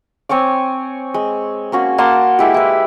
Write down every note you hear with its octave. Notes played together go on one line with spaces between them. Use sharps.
C4 C#5 G#5 D6
G#3
A#3 C#4 F#4 G#4
A#3 F#5 A5 C6
G#3 E4 G4
E4 B4